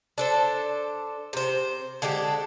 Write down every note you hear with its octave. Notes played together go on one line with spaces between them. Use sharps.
D4 A4 C5
C3 C5
D3 G#3 D4 G4